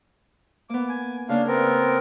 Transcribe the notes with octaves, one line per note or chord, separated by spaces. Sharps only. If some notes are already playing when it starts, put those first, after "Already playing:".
A#3 B3 D6
G#5
C#3 A#3 C#4 D4 F5
B3 C4 A#4